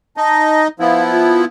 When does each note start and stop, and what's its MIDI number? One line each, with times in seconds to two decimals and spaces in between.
0.17 0.68 63
0.17 0.68 75
0.17 0.61 81
0.80 1.45 53
0.80 1.45 59
0.80 1.45 64
0.80 1.03 77
1.12 1.43 65